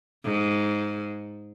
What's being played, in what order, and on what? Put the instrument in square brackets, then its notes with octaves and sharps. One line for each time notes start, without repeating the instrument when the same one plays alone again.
[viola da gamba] G#2